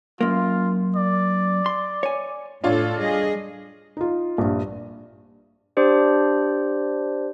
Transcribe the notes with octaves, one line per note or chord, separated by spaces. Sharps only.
F#2 A#3 F4
D5
C6
C#5 G#5
A2 D4 F4 A4 C#5
G3 G#4 D#5
D#4 F4
A#1 G2
D4 G4 C5 D5